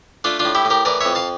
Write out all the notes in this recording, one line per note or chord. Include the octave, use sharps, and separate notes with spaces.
A3 D4 F4
D4 F4
A2
E4 G4
A2
G4 A#4
E3 A#4 D5
F2 C#5 E5
F5 A5